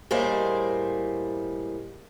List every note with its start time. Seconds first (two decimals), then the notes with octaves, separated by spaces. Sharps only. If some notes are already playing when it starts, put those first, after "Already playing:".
0.11 A2 G3 A#3 G#4 C5 D#5